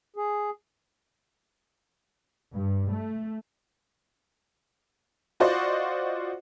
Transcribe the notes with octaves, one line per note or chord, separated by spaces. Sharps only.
G#4
G2
A3
F4 F#4 C5 D5 D#5 C#6